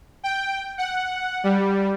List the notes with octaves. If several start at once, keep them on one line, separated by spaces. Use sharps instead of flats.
G5
F#5
G3